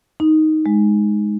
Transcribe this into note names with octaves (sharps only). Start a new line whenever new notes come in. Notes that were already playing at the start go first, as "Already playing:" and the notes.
D#4
G#3